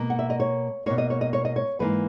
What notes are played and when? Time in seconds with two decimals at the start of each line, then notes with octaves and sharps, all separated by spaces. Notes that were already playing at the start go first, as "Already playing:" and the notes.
Already playing: B2 A#3
0.10 F#5
0.19 E5
0.30 D#5
0.40 C#5
0.86 B2 A#3 C#5
0.98 D#5
1.10 C#5
1.21 D#5
1.33 C#5
1.45 D#5
1.56 C#5
1.79 G#2 E3 A#3 B4